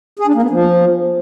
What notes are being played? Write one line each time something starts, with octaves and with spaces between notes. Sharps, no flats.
G#4
D4
A#3
B3
F3